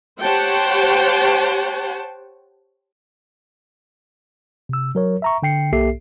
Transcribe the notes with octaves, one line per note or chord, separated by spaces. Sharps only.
G4 C5 C#5 F#5 G5 A5
C3 E6
F#3 A#4 C#5
E5 A#5 C#6
D3 G5 C7 C#7
B1 A#3 G4 A4 E5 C7